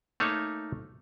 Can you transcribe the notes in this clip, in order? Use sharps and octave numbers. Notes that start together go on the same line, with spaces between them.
A3 A#3 D#4 C#5